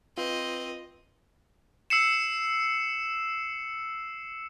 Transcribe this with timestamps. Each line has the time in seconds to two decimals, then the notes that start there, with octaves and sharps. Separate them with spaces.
0.18 C4 F4 B4 D#5
1.90 E6 C7 C#7 E7